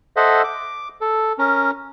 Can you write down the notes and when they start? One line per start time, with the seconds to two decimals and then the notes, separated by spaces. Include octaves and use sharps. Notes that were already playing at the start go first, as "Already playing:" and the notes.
0.17 A4 C5 D#5 E5 F#5
0.44 D6
1.01 A4
1.39 C#4 A#4